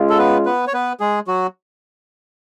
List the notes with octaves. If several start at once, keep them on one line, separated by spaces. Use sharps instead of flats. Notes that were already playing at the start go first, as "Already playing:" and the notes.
Already playing: G#3 C#4 F4
A4
B3 B4
B3 B4
C#5
B3 B4
G#3 G#4
F#3 F#4